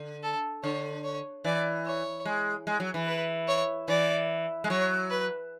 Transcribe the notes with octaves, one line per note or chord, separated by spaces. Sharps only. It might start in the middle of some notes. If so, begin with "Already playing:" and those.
Already playing: D3
A4
D3 C#5
C#5
E3 D5
C#5
G#3
G#3
F#3
E3
B4
C#5
E3 D5
G#3
F#3 C#5
B4